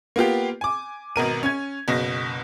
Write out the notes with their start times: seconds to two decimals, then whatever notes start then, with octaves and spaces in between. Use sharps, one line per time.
0.16 A#3 B3 F4 G4
0.61 G#5 D6
1.16 G#1 B2 A#4 D#7
1.43 C#4 G#6
1.88 F#1 B2 A#6